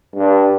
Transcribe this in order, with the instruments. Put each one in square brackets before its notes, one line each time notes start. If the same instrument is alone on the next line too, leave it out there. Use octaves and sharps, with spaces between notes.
[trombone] G2